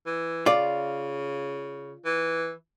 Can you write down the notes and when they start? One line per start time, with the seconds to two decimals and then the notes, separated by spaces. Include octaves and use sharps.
0.06 E3
0.46 C#3 F4 D5
2.05 E3